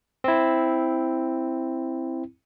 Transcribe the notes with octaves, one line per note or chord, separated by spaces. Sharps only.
C4 E4